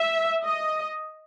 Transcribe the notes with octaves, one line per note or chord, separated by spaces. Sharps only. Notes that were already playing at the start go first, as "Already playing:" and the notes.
Already playing: E5
D#5